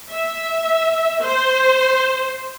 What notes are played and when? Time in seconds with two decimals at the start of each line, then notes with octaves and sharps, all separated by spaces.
0.11 E5
1.22 C5